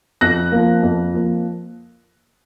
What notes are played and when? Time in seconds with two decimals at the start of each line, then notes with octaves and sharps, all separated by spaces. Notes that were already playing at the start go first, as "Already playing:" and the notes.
0.21 F2 F#6 A#6
0.52 F3 A#3
0.82 F2
1.14 F3 A#3